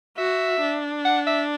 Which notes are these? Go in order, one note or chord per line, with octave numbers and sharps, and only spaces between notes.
F#4 E5
D4
F#5
E5